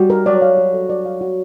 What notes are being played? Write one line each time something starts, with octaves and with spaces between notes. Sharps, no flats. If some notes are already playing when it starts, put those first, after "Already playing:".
Already playing: G3 F#4
A#4
F#3 D5
F5
F#4
A4
D5
F5
F#4